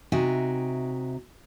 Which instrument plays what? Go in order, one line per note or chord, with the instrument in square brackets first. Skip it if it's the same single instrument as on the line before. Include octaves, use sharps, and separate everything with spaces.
[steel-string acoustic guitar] C3 D#4 F#4 E5 G5 G#5